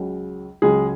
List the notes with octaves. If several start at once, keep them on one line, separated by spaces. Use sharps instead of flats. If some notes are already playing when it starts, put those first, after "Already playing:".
Already playing: C#2 C#3 F#3
C#2 C#3 F#3 G#3 G#4